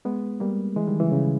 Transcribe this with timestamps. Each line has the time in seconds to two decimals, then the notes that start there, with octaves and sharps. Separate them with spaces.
0.05 G#3 B3
0.40 G3 A#3
0.76 E3 G#3
0.87 D#3 G3
1.00 C#3 E3
1.12 C#3